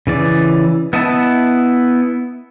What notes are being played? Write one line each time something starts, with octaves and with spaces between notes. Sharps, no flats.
C#3 E3 D5
B3 E4 D#5 A5